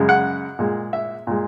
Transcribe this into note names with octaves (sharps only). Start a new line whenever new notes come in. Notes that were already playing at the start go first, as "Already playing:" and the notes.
Already playing: F#2 C#3 G#3
F#5
A#2 G#3
E5
A#2 G#3